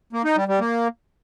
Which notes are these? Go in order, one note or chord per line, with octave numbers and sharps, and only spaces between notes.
A#3
D#4
G3
G3
A#3